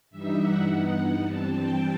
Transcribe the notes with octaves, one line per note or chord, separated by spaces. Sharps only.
G2 E3 G3 D#4 E5
F#5
G2 E3 B3 D#4
F#5
G2 E3 G3 C4 A5
G5